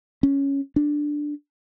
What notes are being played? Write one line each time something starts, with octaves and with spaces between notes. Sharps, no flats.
C#4
D4